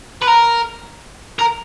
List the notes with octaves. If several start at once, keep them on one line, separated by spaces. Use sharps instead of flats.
B4
A#4
A#4